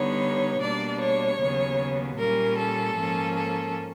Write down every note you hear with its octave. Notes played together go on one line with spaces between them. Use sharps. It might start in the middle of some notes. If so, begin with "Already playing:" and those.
Already playing: D3 G3 B3 D#4 C#5
B2 G3 A#3 D4 D5
C#5
D#2 C#3 F#3 B3
A#2 G3 A#3 C#4 A#4
A4
G#2 F3 A#3 C#4
A4